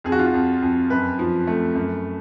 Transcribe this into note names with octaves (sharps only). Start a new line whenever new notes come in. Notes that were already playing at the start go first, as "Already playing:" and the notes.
F2 G#4
F#4
F4
F#4
F2
F2
F#2 B4
F3
A3
F#2